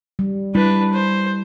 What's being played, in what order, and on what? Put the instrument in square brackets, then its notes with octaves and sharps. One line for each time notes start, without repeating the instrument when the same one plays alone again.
[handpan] G3
[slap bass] G3 [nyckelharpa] D4 B4 [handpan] E4
[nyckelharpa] C5